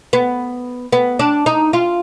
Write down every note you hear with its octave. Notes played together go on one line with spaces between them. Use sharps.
B3
B3
D4
D#4
F4